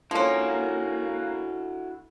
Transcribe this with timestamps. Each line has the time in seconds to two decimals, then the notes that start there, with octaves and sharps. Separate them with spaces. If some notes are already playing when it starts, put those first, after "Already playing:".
0.11 F3 A#3 C#4 D4 E4 F#4 A4